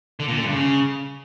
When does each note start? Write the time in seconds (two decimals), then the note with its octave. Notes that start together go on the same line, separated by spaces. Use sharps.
0.20 D3
0.28 A#2
0.36 D3
0.45 G2
0.53 C#3